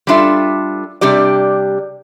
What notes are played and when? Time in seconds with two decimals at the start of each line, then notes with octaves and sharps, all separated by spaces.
0.07 G3 D4 F4 A4 E5
1.01 C3 G3 D4 G4 D5